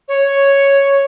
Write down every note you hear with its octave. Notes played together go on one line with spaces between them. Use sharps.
C#5